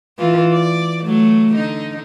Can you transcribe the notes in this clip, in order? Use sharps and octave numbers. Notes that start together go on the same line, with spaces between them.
E3 F4
D5
F#3 A3
D3 D#4